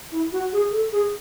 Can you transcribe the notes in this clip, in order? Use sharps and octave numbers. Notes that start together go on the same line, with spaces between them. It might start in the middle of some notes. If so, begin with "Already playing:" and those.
E4
F#4
G#4
A4
G#4